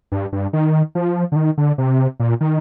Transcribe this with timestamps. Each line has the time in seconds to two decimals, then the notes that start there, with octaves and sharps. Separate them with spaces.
0.12 G2
0.33 G2
0.53 D#3
0.95 F3
1.32 D3
1.36 D#3
1.58 D3
1.78 C3
2.20 A#2
2.41 D#3